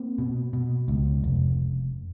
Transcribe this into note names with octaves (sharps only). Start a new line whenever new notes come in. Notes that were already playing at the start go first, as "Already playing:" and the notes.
Already playing: A#3 C4
B2
B2
C#2
F1